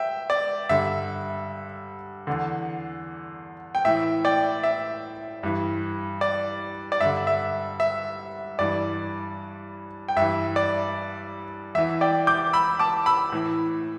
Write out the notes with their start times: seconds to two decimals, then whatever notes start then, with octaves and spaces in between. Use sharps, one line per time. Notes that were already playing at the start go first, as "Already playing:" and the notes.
Already playing: E5 G5
0.30 D5
0.69 G2 D3 E5
2.27 E2 D3
3.75 G5
3.85 A2 E3 E5
4.25 D5 G5
4.63 E5
5.43 G2 E3
6.21 D5
6.92 D5
7.01 G2 D3 E5
7.27 E5
7.80 E5
8.59 G2 E3 D5
10.08 G5
10.16 G2 E3 E5
10.56 D5
11.75 E2 E5
11.78 E3
12.01 D5 G5
12.27 D6 G6
12.53 B5 E6
12.79 A5 D6
13.06 B5 E6
13.32 A2 E3